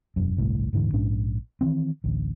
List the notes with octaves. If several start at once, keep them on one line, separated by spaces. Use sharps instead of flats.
E1 F#2
G1 C2 A2
D#1 G#2 D3 E3
A#1 G#2 C#4 D4
D#3 E3 C4
A1 D2